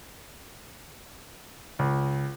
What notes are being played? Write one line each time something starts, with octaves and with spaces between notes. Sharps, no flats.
C#2